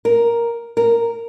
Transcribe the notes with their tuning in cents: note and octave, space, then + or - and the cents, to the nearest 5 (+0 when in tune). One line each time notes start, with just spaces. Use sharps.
A#4 +5
A#4 -5